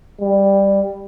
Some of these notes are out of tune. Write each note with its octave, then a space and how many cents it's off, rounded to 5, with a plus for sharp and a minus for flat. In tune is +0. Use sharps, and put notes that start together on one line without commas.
G3 +10